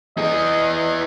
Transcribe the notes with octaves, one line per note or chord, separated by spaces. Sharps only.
E3 G#4 D#5